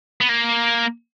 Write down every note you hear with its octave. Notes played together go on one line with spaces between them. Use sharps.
B3
A#3